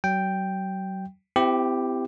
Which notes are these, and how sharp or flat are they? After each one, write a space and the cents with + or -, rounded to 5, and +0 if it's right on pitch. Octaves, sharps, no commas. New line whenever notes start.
F#3 +35 G5 +0
C4 -35 E4 +20 G4 +5